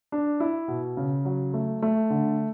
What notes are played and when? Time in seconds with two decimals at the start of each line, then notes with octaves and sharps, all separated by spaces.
0.12 D4
0.40 E4
0.68 B2
0.97 C#3
1.25 F#3
1.54 A3
1.82 A3
2.10 D3